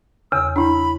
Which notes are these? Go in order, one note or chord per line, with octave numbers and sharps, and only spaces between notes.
E2 C#3 E6
D4 E4 B5